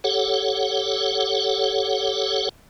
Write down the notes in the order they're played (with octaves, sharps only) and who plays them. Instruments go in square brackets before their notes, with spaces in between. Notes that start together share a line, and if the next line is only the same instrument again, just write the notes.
[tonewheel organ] G4 A4 C#5 F#5